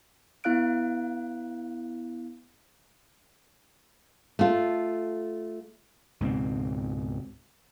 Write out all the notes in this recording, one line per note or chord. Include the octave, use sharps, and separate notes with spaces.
B3 E4 F5 F#6 D7
A3 F4
C#2 G#2 B2 C4